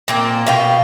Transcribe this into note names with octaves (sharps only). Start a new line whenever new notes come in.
A#2 A#3 C4
B2 F5 G5